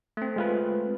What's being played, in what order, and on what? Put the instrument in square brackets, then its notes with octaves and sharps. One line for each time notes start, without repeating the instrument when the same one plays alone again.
[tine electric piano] A3 C4
[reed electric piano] G#3 F4 B4